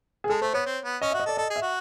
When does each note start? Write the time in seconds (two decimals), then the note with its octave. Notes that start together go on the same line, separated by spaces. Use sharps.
0.24 G#4
0.29 G#3 A4
0.41 A3 C5
0.54 B3 C#5
0.66 C4
0.84 B3
1.02 C#4 D#5
1.11 F#4 E5
1.20 D#5
1.26 A4
1.29 D5
1.37 A4 D#5
1.50 G#4
1.56 E5
1.62 F#4